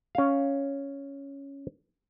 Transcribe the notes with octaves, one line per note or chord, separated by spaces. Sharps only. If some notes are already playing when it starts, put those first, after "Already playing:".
C#4 F5